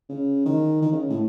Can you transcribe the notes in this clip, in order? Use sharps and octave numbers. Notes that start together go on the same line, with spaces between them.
C#3
D#3
D#3
C#3
A2